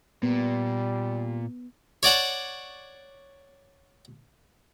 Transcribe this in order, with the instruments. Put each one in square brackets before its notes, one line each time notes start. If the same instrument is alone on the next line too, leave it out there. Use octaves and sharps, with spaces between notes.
[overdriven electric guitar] A#2 [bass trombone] G3 [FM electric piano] B3
[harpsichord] C#5 D5 F#5 A5